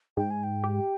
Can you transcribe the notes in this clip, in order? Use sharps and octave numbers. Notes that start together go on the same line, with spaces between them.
G#2 G5
G#5
G5
G4